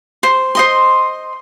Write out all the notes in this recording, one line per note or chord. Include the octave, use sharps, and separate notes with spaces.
C5
C5 D#5 C6